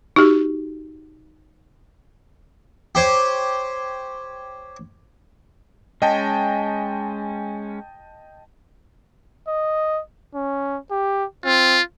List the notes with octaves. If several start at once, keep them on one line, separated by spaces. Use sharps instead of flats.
D#4 F#4 G4
G4 C5 C#5
G#3 C#4 D#5 G5 A5
D#5
C#4
G4
C4 F4